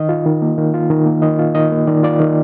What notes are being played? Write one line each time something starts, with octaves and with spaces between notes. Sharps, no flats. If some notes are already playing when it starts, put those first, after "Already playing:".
Already playing: D#3 D#5
F4
D#3
A#3
D#3
F4
D#3
A#3
D#3 D#5
F4
D#3 D#5
A#3
D#3 D5
F4 D5
D#3